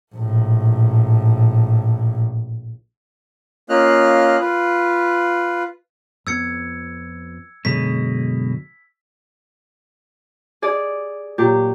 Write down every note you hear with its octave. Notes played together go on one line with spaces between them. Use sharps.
A#1 A2
A#3 C#4 F4 D#5 F6 F#6
F4 B4
F2 B3 E6 G#6 C#7
F#2 B2 D3 F#3 G#3 B6
G#4 D5
A#2 F#3 G4